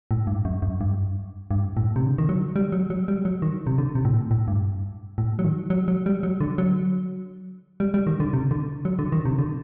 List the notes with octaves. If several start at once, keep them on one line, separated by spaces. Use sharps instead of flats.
A2
G2
F#2
F#2
G2
G2
A2
C3
D3
D#3
F#3
G3
F#3
F#3
G3
F#3
D#3
C3
D3
C3
A2
A#2
A2
G2
A2
F#3
D#3
F#3
F#3
G3
F#3
D3
F#3
G3
G3
D#3
D3
C3
D3
F#3
D3
D#3
C3
D3